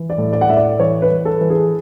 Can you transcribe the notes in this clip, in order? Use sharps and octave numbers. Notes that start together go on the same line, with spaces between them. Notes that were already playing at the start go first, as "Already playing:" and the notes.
Already playing: E3
D5
A2
D5
F#5
A2 E5
D5
E3 C#5
B4
E3
A4
E3
G#4